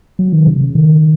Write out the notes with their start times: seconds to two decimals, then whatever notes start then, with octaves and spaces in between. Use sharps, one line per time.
0.19 F#3
0.32 D#3
0.47 C#3
0.61 C#3
0.75 D#3